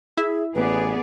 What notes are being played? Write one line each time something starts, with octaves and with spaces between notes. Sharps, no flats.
E4 G#4 E5
A1 B3 G#4 B4 D5